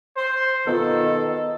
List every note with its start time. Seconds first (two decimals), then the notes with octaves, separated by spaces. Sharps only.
0.17 C5
0.67 B2 D#3 B3 F4 A4 D#5